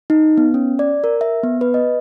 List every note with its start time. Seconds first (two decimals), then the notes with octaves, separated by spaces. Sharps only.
0.10 D#4
0.37 B3
0.54 C#4
0.79 D5
1.04 A#4
1.21 E5
1.43 B3
1.61 B4
1.74 D#5